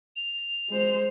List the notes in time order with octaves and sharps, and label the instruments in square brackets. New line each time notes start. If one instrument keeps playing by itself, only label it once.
[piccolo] F7
[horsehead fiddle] G#3 C5